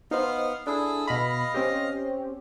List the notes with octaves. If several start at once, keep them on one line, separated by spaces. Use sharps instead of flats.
B3 D#4 C5 F5
D4 E4 G#4 A4
B2 D#5 F5 B5
C4 C#4 G4